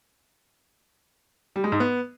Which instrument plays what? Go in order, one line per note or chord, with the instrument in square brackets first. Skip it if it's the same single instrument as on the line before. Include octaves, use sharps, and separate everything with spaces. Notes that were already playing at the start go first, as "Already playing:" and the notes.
[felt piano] G3
G#3
G#2
B3